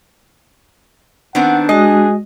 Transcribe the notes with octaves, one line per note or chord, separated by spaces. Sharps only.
D#3 B3 C4 D4 F#5
G#3 F#4 G#4 D#5